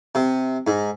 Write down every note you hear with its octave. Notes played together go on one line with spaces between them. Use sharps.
C3
G#2